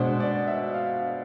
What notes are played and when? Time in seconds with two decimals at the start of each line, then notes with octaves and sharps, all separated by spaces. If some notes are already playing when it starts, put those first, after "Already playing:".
Already playing: B2 G#3 D4 C5
0.20 D5
0.47 E5
0.74 F5